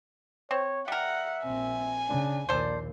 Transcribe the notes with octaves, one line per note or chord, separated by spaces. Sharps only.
C4 C#5
G3 A#4 E5 F#5
A#1 C4 G#5
C#3 D4
A#1 D#2 A4 C5 D5